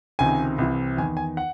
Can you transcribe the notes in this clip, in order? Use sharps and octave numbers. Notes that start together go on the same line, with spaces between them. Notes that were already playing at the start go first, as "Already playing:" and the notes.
C#2 C3 D#3 G#5
C2 C3 E3
E2 D#3 G#5
G#5
F#5